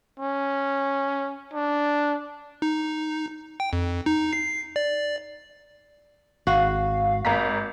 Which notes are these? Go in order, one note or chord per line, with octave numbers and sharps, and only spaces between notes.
C#4
D4
D#4
G5
F2
D#4
C7
D5
G#1 F#4 F5
G#1 A#5 B6